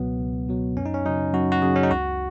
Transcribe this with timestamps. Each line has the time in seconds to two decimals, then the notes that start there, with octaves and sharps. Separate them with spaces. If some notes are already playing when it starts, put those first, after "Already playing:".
Already playing: C#2 B2 F#3 B3
0.20 C#2
0.49 B2 F#3
0.77 F#2 C#4
0.86 D#4
0.94 C#4
1.05 C#3 F#3 D#4
1.34 F#2 F#4
1.52 F#4
1.62 C#3 F#3 G#4
1.76 C#4
1.83 D#4
1.91 C#2 F#4